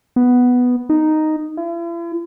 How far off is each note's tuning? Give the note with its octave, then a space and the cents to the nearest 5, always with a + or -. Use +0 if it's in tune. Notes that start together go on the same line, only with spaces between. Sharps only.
B3 +0
D#4 -5
E4 +45